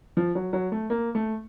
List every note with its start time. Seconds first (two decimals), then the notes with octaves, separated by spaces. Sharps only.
0.17 F3
0.35 F#3
0.53 F#3
0.72 A3
0.90 A#3
1.15 A3